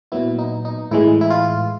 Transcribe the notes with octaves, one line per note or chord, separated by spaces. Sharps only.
A#2 F#3 B3 E4
D#4
D#4
A2 E3 G#3 E4
E4
F4